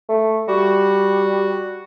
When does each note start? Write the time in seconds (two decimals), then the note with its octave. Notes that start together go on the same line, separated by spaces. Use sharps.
0.09 A3
0.48 G3 F#4